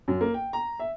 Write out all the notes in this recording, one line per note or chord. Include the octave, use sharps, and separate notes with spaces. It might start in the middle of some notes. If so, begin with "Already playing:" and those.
F#2
A#3
G5
A#5
E5